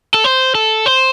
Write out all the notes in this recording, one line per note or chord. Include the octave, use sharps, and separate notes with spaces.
A4
C5
A4
C5